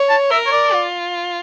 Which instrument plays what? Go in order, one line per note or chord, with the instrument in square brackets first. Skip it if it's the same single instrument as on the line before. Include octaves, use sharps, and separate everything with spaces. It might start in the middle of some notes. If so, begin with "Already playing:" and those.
Already playing: [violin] C#5
[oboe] A5
[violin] A#4 [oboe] E5
[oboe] C#5
D5
[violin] F4